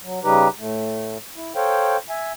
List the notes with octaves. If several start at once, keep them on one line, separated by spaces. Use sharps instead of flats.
F#3
C#3 G3 D#4 G4 B4
A2 A3
E4
A4 C5 C#5 F5 G5
E5 G#5